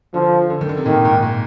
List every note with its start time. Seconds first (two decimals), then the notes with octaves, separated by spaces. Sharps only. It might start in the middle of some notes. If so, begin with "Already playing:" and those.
0.14 D3 F3
0.50 D3
0.61 D#3
0.69 D3
0.77 C3
0.86 A#2 D#3
1.05 G#2
1.23 A#2